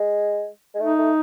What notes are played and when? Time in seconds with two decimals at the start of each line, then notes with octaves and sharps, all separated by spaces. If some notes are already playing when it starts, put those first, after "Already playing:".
Already playing: G#3
0.75 G#3
0.80 A3 D#4
0.99 A3